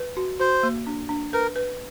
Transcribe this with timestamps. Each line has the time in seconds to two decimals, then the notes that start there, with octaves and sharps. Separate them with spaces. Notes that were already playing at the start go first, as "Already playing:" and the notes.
Already playing: B4
0.17 F#4
0.39 F#4 C5
0.63 A#3
0.87 D4
1.09 D4
1.33 A#4 B4
1.56 B4